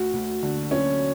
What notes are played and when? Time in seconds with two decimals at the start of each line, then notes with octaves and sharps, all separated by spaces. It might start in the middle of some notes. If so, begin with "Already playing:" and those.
Already playing: D2 F#4
0.13 D2
0.43 D3
0.71 F#3 C#4